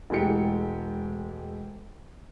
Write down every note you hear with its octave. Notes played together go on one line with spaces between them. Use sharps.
E1 E3 G#3 A3 G4 C#7